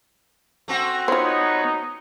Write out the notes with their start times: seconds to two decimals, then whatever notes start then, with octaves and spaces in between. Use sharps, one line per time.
0.68 A3 C4 F#4
1.08 B3 D#4 F4 C5 C#5